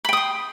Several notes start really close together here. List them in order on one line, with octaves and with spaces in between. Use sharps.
B5 G5 D#6 C6